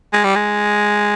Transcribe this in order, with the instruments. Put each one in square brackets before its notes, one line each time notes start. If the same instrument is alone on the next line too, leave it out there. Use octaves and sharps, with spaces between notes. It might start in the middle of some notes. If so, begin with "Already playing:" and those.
[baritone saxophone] G#3
G3
G#3